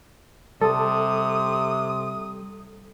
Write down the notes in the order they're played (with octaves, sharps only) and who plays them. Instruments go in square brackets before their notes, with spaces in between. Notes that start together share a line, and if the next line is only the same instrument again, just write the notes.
[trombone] C3 [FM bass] G3 [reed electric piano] A4 [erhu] D#6